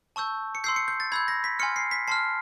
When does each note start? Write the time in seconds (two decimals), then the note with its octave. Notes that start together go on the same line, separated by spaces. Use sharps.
0.16 A5 C#6 E6 G6
0.55 C#7
0.64 C6 E6 G6 C7
0.76 C#7
0.88 G6
1.00 A6
1.12 B5 E6 G6 G#6
1.28 A#6
1.44 B6
1.59 G#5 C6 F6 C#7
1.76 C7
1.91 B6
2.08 A5 C6 F6 C7